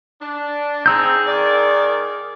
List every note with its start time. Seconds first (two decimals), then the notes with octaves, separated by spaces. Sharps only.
0.21 D4
0.86 C4 D#4 G#4 E6 G6
1.27 D#3 A#4 D5